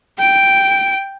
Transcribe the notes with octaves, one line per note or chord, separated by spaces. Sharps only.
G5 D7